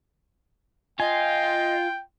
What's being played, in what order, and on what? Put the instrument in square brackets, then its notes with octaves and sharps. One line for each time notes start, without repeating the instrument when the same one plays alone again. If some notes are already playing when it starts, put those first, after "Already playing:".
[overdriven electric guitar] F4 [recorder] D#5 [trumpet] G5 [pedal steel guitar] G#5